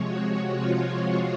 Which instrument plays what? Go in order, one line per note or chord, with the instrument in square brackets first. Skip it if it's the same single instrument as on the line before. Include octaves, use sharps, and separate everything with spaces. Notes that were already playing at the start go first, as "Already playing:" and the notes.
Already playing: [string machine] C3 F3 G#3 C#5
F#4
F4